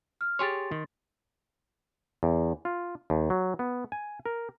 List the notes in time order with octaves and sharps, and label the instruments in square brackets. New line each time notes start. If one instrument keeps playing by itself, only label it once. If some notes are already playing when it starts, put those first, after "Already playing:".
[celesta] F6
[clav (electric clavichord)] G4 G#4 C#5 [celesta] C6 A6
[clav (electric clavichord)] D#3
E2
F4
D#2
F#3
B3
G#5
A#4